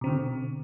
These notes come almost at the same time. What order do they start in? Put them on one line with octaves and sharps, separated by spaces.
B2 C4 D3